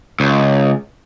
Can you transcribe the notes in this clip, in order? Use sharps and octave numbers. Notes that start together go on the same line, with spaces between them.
C#2